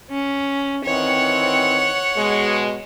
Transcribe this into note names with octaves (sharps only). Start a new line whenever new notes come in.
C#4
D#3 E3 C4 C#5 F#5
B2 G#3